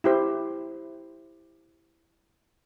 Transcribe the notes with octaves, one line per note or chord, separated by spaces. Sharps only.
E4 G4 C5